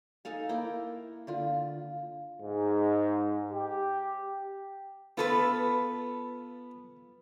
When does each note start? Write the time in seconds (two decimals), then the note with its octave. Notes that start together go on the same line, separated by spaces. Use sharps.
0.25 D#4 A4 F5 G#5
0.49 A#3 E4 G5
1.27 D3 F4
2.42 G#2
3.52 G4
5.17 B3 F4 A4 B4